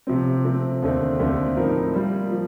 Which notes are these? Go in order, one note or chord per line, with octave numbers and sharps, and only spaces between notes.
C3 F3 C4
F3 A3 C4
D#2 D3 A3 C4
D#2 D3 A3 C4
A2 F3 C4 D#4 A#4
G3 A#3 F4
F3